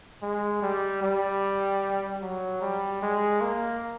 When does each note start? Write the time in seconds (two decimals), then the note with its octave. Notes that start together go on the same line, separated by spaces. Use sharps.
0.22 G#3
0.62 G3
1.03 G3
2.22 F#3
2.62 G3
3.02 G#3
3.41 A#3